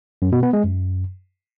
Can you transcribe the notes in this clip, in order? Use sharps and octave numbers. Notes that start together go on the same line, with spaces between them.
F#2
B2
B3
G#3
F#2